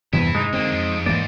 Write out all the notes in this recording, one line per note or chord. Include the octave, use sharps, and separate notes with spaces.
E2 G2 C3 E4 B4
G#3 D#4
D3 A#3 C4
F2
G#2 E3 A#3 D5